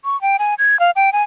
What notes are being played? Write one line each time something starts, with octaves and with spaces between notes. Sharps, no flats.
C#6
G5
G#5
G#6
F5
G5
G#5